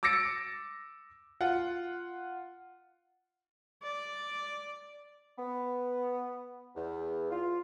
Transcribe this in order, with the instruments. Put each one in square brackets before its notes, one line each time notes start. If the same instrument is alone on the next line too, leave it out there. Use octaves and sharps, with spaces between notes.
[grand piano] D6 E6 A6 A#6 C#7 D7
F4 F#5
[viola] D5
[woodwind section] B3
E2
F4